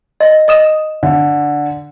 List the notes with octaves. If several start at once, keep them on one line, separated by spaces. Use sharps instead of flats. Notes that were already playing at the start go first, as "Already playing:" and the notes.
D#5
D#5 D#6 E7
D3